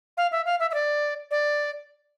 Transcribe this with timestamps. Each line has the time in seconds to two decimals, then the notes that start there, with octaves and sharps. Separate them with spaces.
0.17 F5
0.32 E5
0.46 F5
0.60 E5
0.70 E5
0.74 D5
1.31 D5